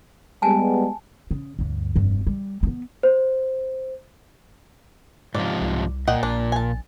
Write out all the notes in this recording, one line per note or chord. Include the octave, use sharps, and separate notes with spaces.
G3 G#3 B3 G#5 A5
C#3
D2 G2
F1 G2
G3
A3 B3
C5
G#2 C3 F3 D5
C2
A#2 D#5 F#5 G5
A#1 D4
G#5 A5